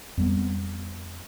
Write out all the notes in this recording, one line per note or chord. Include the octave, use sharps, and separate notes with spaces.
F2 G3 B3